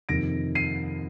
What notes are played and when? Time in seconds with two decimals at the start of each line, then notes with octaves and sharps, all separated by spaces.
0.09 F2 C3 D#3 A#3 A#6 D7
0.55 C7 D#7